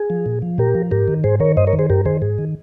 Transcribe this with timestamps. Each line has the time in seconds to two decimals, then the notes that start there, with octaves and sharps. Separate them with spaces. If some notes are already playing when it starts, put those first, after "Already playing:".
Already playing: G#4
0.10 F3
0.26 A#2
0.42 F3
0.58 A#2 G4 A#4
0.75 F3
0.91 G#2 G4 A#4
1.08 D#3
1.24 G#2 G#4 C5
1.40 D#3 A#4 C#5
1.57 G2 C5 D#5
1.67 A#4 C#5
1.73 D#3
1.79 G#4 C5
1.90 G2 G4 A#4
2.05 D#3 G#4 C5
2.22 G#2 G#4
2.38 D#3